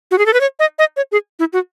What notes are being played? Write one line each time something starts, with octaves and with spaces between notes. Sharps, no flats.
F#4
G#4
A4
B4
C#5
D#5
D#5
C#5
G#4
E4
F#4